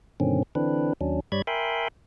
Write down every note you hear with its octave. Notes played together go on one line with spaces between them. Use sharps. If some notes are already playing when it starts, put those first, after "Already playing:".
G2 B2 D3 D#3 C4 C#4
D3 E3 C4 D4 B4
D#2 F#3 C#4 D4
G2 G3 C#5 D5 B5 G#6
A#4 E5 G5 G#5 B5 C6